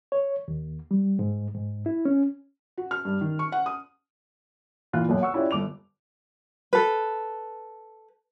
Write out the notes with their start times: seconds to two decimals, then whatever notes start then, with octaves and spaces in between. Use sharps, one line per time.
0.12 C#5
0.48 D#2
0.91 G3
1.19 G#2
1.55 G#2
1.86 E4
2.05 C#4
2.78 F#4
2.91 F6
3.05 G2
3.21 D#3
3.39 C#6
3.52 F#5
3.66 D#6
4.93 A#2 E3 F4 F#6
5.09 B1 F#2
5.21 F#5 C#6 E6
5.34 C#4 E4 F4 G4 D5
5.51 G1 D6 F7
6.73 A4 B4